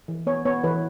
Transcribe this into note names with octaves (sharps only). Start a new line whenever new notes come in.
E3
B3 C#5
B3 C#5
E3 B4